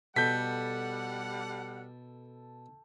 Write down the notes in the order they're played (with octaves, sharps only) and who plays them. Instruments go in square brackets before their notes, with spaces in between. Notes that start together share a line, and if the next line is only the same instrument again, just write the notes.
[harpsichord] B2 [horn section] G3 F#5 [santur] A4 [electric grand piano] G6 B6